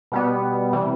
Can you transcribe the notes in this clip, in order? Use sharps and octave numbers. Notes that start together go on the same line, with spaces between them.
B2 G3 B3
C3 E3 G3